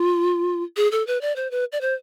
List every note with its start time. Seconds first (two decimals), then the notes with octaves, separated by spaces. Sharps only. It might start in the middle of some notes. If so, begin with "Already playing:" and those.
Already playing: F4
0.77 G#4
0.92 A4
1.07 B4
1.21 D5
1.36 C5
1.51 B4
1.72 D5
1.81 C5